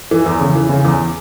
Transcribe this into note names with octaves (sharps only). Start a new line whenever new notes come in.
E3
E2
C#3
E3
C#3
E2